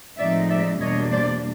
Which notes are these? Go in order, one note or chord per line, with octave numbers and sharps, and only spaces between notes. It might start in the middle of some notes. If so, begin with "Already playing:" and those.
A2 F3 G#3 C4 D#4 D5 E5
D5 E5
E2 B2 G3 A#3 D4 C#5 D#5
C5 D5